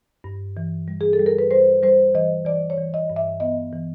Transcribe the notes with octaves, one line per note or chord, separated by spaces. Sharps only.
G2
E3
G3
G#4
A4
G3
A#4
B4
G3 C5
G3 C5
E3 D#5
E3 D5
C#5
E3
D#5
G2
E5
B3 D#5
E3